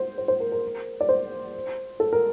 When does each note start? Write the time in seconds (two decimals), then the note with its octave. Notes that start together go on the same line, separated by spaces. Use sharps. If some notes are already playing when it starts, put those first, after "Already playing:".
Already playing: C5
0.18 C5
0.28 C5
0.40 A#4
0.52 A#4
1.01 D5
1.09 C5
2.00 A4
2.13 A#4